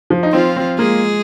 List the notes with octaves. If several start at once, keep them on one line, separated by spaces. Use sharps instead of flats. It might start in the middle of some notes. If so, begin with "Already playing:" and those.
F3
D#4
F3 C4 F4
C4
G#3 A#3 G#4